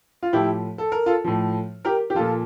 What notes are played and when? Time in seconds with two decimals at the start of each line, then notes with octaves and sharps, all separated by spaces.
0.23 F4
0.33 A2 F3 E4 G4
0.78 A4
0.92 A#4
1.06 F4 A4
1.24 A2 F3
1.85 G4 A#4
2.10 G4
2.15 A#2 F3 F4 A4